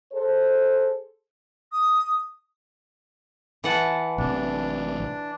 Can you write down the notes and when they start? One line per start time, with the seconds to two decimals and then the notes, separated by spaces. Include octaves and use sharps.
0.12 G#4 A4 C5
1.72 D#6
3.64 E3 F#5 A5
4.18 A1 C3 D4